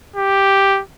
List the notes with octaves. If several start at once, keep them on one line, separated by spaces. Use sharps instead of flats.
G4